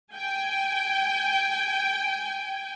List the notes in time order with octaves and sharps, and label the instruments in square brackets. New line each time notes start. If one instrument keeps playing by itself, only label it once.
[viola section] G5 G#5